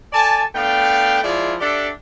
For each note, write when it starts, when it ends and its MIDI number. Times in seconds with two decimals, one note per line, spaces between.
0.13 0.43 69
0.13 0.43 74
0.13 0.43 80
0.13 0.43 81
0.54 1.19 57
0.54 1.19 59
0.54 1.19 62
0.54 1.19 77
0.54 1.19 79
1.23 1.54 53
1.23 1.54 56
1.23 1.54 64
1.23 1.54 65
1.23 1.54 68
1.23 1.54 74
1.60 1.88 62
1.60 1.88 67
1.60 1.88 69
1.60 1.88 74
1.60 1.88 76
1.60 1.88 78